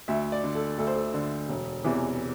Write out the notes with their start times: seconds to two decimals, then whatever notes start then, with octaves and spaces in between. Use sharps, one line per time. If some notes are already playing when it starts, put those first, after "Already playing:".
0.08 D2 E5
0.32 D5
0.44 D3
0.55 A4
0.78 D2 A4
0.87 C5
0.96 A4
1.14 D3
1.49 E1
1.84 E2 C3 E3